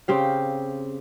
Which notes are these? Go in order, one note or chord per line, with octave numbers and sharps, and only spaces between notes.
C#3 C4 G4 F5